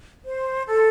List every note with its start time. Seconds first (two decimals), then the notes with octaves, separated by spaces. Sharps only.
0.23 C5
0.66 A4